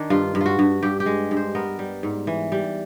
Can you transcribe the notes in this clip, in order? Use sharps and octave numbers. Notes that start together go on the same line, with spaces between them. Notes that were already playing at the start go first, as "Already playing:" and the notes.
Already playing: D#3 D4
G2 F4
G2
F4 F#4
G2
G2 G4
G4
G#3
G2
C5
B3 A#4
G3
G#2
E3
G3